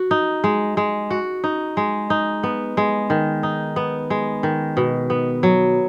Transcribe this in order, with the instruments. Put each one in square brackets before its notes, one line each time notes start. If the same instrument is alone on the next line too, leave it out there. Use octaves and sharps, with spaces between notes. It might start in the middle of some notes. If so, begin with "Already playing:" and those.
Already playing: [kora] F#4
D#4
G#3
G#3
F#4
D#4
G#3
D#4
B3
G#3
D#3
D#4
B3
G#3
D#3
B2
B3
F#3